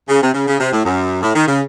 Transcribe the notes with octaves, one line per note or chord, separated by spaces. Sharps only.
C#3
C3
C#3
C#3
C3
A2
F#2
A2
D#3
C#3